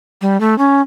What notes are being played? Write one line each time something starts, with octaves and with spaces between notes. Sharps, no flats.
G3
A3
C#4